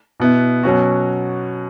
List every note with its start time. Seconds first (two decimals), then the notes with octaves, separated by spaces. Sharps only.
0.20 B2 B3 E4
0.63 B2 F#3 C#4 F#4